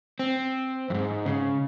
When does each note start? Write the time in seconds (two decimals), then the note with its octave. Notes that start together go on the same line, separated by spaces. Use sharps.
0.19 C4
0.90 F2 G#2
1.26 C#3